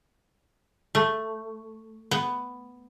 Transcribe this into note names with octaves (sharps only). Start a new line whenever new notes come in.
A3
B3